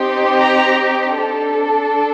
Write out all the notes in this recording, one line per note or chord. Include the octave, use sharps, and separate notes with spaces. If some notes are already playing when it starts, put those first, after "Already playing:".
Already playing: C4 D#4 G4
A#5
D4 A4